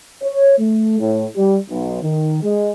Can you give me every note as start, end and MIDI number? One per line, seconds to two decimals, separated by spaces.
0.23 0.57 73
0.59 0.99 57
1.00 1.27 45
1.37 1.57 55
1.70 1.99 35
2.02 2.41 51
2.43 2.71 56